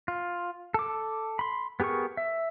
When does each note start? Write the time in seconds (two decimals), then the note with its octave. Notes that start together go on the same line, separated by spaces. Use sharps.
0.08 F4
0.74 A4 D6
1.39 B5 C6
1.80 B3 G4 G#4 A#4 C#6
2.17 E5